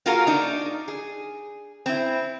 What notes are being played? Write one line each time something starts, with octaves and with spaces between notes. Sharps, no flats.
A#3 F4 F#4 G#4 A#4
D4 D#4
G#4
C4 E4